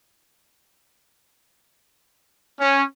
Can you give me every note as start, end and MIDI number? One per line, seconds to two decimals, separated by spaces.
2.60 2.83 61